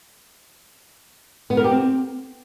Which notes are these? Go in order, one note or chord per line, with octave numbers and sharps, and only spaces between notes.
B3
A#4
G4
C4